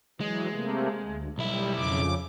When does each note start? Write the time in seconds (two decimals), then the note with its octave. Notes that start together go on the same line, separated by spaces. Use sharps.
0.21 E3 F#3 G#3
0.51 C3 A3 A#3
1.03 D2
1.38 B1 G3 E4
1.75 F2 C#3 D6